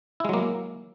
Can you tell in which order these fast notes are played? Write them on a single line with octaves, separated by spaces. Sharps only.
E4 G#3 F#3 A#3